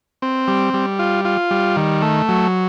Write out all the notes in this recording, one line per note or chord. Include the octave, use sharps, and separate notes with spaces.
C4
G3
G3
F4
F4
G3
D#3
A3
F#3